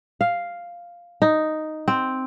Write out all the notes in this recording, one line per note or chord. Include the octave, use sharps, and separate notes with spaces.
F5
D#4
C4